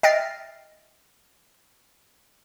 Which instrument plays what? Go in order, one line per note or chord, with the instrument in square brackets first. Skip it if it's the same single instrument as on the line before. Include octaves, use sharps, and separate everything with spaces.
[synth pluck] D#5 E5 G5 F6 A6 C7